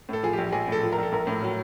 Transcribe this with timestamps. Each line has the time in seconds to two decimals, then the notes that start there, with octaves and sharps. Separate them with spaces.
0.09 A2 A4
0.23 F3 G#4
0.33 A#1 G4
0.52 A#1 G#4
0.68 A2 A4
0.83 F3
0.92 A#4
0.98 A#1 A4
1.12 A#1 A#4
1.27 A2
1.43 F#3